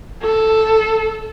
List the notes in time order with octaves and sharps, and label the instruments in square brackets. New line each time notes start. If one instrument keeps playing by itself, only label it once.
[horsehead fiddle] A4